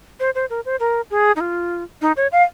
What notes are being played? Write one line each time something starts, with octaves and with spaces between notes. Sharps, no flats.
C5
C5
A#4
C5
A#4
G#4
D#4
F4
D#4
C#5
F5